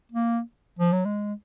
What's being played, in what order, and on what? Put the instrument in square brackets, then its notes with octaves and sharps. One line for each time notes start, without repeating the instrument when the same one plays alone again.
[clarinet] A#3
F3
F#3
G#3